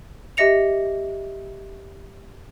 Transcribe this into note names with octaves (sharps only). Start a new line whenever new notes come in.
G4 D#5 E5 A#6 C#7 F7